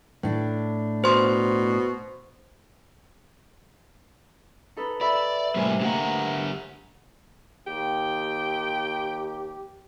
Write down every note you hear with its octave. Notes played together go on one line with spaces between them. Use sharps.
A2 D4
B2 C5 C6
D#4 A4 B4
A4 D5 E5 B5
A2 C3 G3 A3 A#3 G#5
D3 A#3 G4 F#5 G#5
D#2 G4 G5